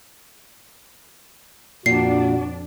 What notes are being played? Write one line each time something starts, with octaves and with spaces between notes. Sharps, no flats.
F2 A#2 D4 F#4 C7